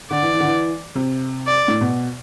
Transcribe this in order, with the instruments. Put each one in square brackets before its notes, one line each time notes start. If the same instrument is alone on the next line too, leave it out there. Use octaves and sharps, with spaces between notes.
[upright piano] D3 [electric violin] D5
[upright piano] E3
E3
D3
E3
C3
[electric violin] D5
[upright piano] A2
B2